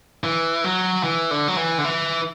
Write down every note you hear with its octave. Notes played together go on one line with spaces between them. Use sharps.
E3
F#3
E3
D3
F#3
E3
D3
E3